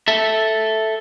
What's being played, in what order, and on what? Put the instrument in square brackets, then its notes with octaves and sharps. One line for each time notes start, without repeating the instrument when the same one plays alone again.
[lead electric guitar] A4 E5